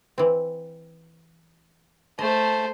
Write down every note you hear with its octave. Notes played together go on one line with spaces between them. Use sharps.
E3 C4
A3 C5 D#5